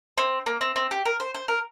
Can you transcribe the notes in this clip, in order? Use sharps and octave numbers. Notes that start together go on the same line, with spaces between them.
C4
A#3
C4
C4
G4
A#4
C5
C5
A#4